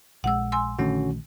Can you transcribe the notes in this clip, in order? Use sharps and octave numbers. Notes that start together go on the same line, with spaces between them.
A#1 D#3 G#3 F#5 E6
G#5 C6 E6
A#1 D3 D#3 A3 C#4 F#4